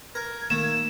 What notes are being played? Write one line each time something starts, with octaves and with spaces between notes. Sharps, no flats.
A#4 G#6
D#3 A3 A#3 E7